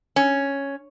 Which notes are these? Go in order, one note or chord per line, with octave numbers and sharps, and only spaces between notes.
C#4